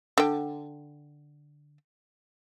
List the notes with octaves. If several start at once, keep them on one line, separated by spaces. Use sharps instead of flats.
D3 G5